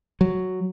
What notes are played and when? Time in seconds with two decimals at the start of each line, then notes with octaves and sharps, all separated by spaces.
0.21 F#3